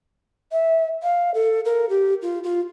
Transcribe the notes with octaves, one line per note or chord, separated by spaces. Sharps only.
E5
F5
A4
A#4
G4
F4
F4